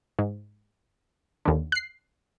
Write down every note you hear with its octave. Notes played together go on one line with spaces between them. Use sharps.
G#2
D#2 D3
F#6 C7